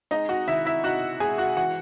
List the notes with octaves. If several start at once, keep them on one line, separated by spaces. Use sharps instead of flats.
G#3 D#4 D#5
F#4 F#5
D#3 E4 E5
E4 E5
D#4 F#4 F#5
G#3 G#4 G#5
F#4 F#5
E3 F#4 F#5